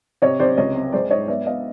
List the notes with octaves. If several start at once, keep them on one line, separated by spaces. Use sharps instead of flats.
C3 C#5 D#5
C3 C5 D5
C#2 C#5 D#5
C4
G#3 C5 D5
G#2 C#5 D#5
B3 D5 E5
B3 D#5 F5